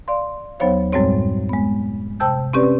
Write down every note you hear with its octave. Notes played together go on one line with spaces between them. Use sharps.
D5 F5 C6
D#2 F#3 B3 C5 C#5 F5
F#2 A2 G3 G#3 C4 C#5
G#3 B3
C3 C5 G5 A5 E6 G6
C4 C#4 G4 B4 D5